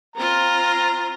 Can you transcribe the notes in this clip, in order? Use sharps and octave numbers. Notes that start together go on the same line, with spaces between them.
C4 F4 A#5